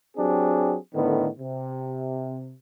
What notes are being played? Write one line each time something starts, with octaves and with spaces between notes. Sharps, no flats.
F#3 C4 D4 G4 G#4
A2 D3 D#3 B3
C3